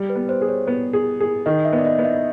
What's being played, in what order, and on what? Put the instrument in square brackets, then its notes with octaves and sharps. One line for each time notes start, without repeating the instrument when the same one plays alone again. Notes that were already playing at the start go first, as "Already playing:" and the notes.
Already playing: [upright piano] G3
[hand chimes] B4
[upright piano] B3
[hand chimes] C5
[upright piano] G#4
[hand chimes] C#5
[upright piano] B3
G#4
G#4
[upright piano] D#3 [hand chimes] D#5
[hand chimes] E5
[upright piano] B3
[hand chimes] D5
D#5
[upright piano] B3 [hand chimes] D#5
[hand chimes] E5